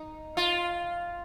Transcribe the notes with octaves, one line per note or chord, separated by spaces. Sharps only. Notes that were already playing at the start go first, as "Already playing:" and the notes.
Already playing: D#4
F4